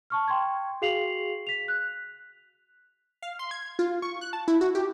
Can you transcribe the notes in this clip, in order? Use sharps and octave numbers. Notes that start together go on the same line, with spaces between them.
A5 C#6 F6
G5 C6 C#6 G#6
F#4 G#4 F5 C7 F7 F#7
B6 F7
F#6
F5
C6
G#6
F4
C#6
F#6
A5
E4
F#4
G4